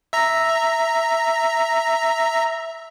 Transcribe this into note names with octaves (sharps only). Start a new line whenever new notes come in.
E5 A#5